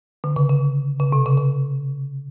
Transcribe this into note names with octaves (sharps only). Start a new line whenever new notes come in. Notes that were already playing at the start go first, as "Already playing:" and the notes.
D3
C#3
C#3
C#3
C3
C#3
C#3